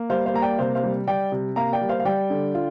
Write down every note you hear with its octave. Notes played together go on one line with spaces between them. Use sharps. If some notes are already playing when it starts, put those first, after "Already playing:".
Already playing: A#3
G3 C5 F5
C5 F5
A#3 A#5
D5 G5
C3 C5 F5
C5 F5
G3
G3 D5 G5
C3
A#3 F5 A#5
D5 G5
G3
C5 F5
F5
G3 D5 G5
D3
F4